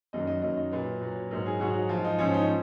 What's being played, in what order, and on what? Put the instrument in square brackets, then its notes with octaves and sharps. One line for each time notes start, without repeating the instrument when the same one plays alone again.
[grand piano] F#2 D#3 F#3 D#5
D#5
F#2 D#3 F#3 D#5
D#5
A#2 F#3 B4
A#2 F#3
G#2 F#3 A#4
G#4
G#2 F#3 F#4
F3 F4
G#2
D#4
G#2 F3 C#4
D#4
C#4